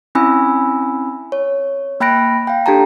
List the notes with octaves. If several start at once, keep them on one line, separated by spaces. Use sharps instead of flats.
C4 C#4 E4 G#5 B5 E6
C#5
A#3 G5 B5 F#6 A#6 D7
F5 G5
D4 G4 A4 G5 A5 A#5